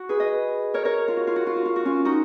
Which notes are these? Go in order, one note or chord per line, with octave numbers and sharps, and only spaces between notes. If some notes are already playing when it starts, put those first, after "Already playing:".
Already playing: F#4
G#4 B4
B4 D#5
A#4 C#5
A#4 C#5
F4
F#4
F4
F#4
F4
F#4
F4
F#4
C#4 F4
D#4 F#4